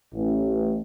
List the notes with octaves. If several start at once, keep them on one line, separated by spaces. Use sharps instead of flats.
A1